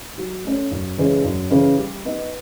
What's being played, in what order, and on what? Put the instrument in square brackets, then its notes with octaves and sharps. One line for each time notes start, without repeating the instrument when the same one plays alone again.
[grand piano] F#3
A3 C#4
F#2
C#3 E3 G#3 C#4
F#2
C#3 E3 G#3 C#4
G3
B3 D#4